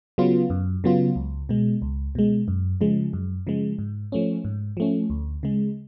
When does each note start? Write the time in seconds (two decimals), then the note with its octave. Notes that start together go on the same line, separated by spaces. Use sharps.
0.18 C#3 F#3 B3 F4
0.50 F#2
0.84 C#3 F#3 B3 F4
1.16 C#2
1.49 B2 G#3
1.82 C#2
2.15 B2 G#3
2.48 F#2
2.81 C#3 F3 G#3
3.13 F#2
3.47 C#3 F3 G#3
3.79 G#2
4.12 F3 A3 C#4
4.44 G#2
4.77 F3 A3 C#4
5.10 D2
5.43 C#3 G#3